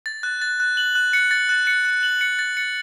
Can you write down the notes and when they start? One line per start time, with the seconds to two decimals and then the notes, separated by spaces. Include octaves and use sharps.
0.06 A6
0.23 F#6
0.42 A6
0.60 F#6
0.77 F#7
0.95 F#6
1.13 C#7
1.31 A6
1.49 F#6
1.67 C#7
1.85 F#6
2.03 F#7
2.21 C#7
2.39 A6
2.57 C#7